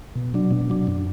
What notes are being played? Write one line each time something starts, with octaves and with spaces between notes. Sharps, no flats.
B2
F#3 D4
B2
F#3 D4
F#2